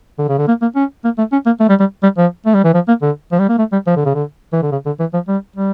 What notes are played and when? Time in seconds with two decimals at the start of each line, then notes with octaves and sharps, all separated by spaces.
0.19 D3
0.29 C#3
0.38 D3
0.48 A#3
0.62 A#3
0.76 C#4
1.04 A#3
1.18 A3
1.32 C#4
1.46 A#3
1.60 A3
1.69 G3
1.80 G3
2.03 G3
2.18 F3
2.46 A3
2.54 G3
2.64 E3
2.74 F3
2.88 A#3
3.02 D3
3.32 F3
3.39 G3
3.49 A#3
3.58 A3
3.72 G3
3.87 F3
3.96 D3
4.05 C#3
4.15 D3
4.53 E3
4.62 D3
4.72 C#3
4.86 D3
5.00 E3
5.14 F3
5.28 G3
5.56 G3